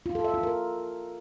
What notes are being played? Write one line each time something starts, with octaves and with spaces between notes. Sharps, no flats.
F4
A4
E5
F4
A#4